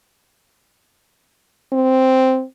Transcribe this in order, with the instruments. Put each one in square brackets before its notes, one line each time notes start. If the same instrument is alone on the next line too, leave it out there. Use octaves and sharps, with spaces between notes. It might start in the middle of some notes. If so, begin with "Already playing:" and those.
[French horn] C4